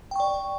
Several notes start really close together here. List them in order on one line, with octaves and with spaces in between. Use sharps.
G5 C#6 D5